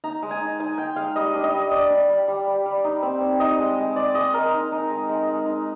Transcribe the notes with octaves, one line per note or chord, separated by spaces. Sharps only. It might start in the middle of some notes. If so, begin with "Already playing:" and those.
D#4 A#5
G#3
G#5
D#4
D#4 G#5
G#3 G5
G#3 F5
G3 D#5
D4
D#5
G3
D4 D5
D4
G3
G3
G3
G3
D#4
C4
C4
D#4 D#5
G#3
G#3
G#3 D5
G#3 D#5
G#3 A#4
D#4
D#4
G#3
G#3
G#3
D#4